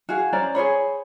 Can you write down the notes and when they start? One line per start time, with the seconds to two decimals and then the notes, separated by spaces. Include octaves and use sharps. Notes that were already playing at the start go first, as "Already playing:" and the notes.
0.09 F#4 G#4 F5
0.33 C#4 C5 D5 A#5
0.55 G#4 C5 C#5 B5